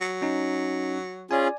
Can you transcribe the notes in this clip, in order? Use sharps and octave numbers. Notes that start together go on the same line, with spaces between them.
F#3
C#4 D#4
C#4 F4 G#4 D5 G#5